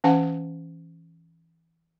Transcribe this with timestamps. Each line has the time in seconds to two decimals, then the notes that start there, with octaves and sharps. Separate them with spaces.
0.04 E3 C#4 F5 F#5 G#5